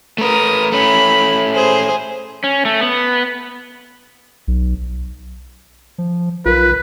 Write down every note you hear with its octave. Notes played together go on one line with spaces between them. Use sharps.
A3 A#4 B4 D#6
A3 C#4 B5
G#4 C5
C#4
A3
B3
B1
F3
B1 F4 A#4 B4